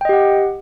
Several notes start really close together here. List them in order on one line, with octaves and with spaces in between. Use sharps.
G5 D#5 G4 F#5